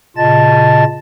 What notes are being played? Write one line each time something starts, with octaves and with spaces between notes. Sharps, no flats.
A#2 C#3 F4 D#5 A5 A6